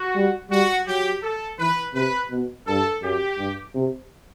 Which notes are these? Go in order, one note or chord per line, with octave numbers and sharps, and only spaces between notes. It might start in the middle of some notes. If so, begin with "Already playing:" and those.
Already playing: F#4
G3
G3 F#4
F#3 G4
A4
E3 B4
C3 B4
B2
G2 A4
F#2 G4
G2
C3